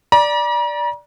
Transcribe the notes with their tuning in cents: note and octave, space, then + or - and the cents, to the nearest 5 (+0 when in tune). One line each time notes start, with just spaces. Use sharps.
D5 +0 A#5 +40